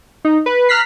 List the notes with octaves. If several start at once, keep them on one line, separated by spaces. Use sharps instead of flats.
D#4
B4
A#5 F6 F#6 B6 C7